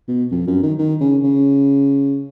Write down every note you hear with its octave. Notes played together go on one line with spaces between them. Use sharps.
B2
F2
F#2
D#3
D#3
C#3
C#3